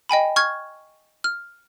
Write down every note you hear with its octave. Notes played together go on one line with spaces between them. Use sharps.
D#5 G5 G#5 B5
C#6 F6 G#6
F6